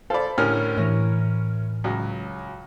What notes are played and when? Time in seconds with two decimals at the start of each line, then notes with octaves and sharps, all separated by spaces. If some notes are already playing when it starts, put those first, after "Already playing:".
0.10 A4 C5 D5 F5 B5
0.38 A2 D3 G3 C#4 A#4 F6
0.77 A2 E3 C#5 A#6
1.84 C#2 F#3